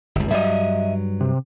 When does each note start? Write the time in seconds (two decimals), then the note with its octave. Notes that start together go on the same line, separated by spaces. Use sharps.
0.16 G1 C#2
0.31 G2 F#3 D#5 E5
1.21 C3